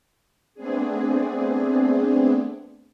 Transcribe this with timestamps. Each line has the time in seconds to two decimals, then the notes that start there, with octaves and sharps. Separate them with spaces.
0.55 A3 B3 C4 D4 G#4